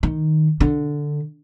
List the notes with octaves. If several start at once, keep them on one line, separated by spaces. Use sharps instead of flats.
D#3
D3